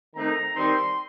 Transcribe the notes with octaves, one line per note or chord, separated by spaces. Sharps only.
D#3 A3 C4 D#4 A#5
D#3 G3 C4 D#4 C6